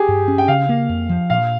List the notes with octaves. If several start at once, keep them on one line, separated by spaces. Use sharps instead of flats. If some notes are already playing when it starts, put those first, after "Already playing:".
Already playing: G4 G#4
G2
C#4
G5
C#3 F5
A#3
F2
F3
A#2 F5